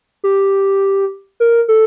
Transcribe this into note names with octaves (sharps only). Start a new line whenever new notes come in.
G4
A#4
A4